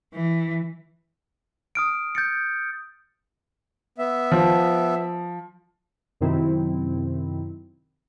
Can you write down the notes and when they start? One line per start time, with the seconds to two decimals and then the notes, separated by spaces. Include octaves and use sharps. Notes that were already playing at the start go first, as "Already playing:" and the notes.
0.14 E3
1.75 D#6 F6 D7
2.15 G6 A6 C#7
3.98 B3 E5
4.32 F3
6.21 F#2 C3 D#3 C4 E4